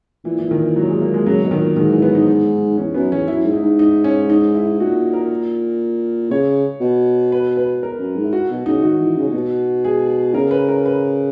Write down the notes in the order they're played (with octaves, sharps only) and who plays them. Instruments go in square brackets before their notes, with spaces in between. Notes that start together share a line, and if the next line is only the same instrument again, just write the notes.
[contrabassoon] A#2 [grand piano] E3
[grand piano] E3
D#3
E3
F#3
G#3
A#3
G#3
[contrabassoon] C#3 [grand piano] F#3
[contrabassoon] B2
[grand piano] D#3
[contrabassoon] A#2
[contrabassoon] G#2 [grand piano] D#3
[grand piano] E3
B3
D#4
D#4
[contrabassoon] E2 [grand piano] C#4
[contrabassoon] F#2 [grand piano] B3
[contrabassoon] E2 [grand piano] C#4
[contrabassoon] F#2 [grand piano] E4
[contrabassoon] G#2
[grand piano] D#4
[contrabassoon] G#2
[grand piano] D#4
C#4
D#4
E4
[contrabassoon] A#2 [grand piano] F#4
[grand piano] A#4
[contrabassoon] C#3 [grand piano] C#5
[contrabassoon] B2
[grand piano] B4
B4
A#4
[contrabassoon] F#2
G#2
[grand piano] E4
F#4
[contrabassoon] B2
[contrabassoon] C#3 [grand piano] D#4
[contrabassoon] D#3 [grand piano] F#4
[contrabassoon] E3
C#3
A#2
B2
[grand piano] G#4
[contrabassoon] C#3 [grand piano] A#4
[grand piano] B4
A#4
B4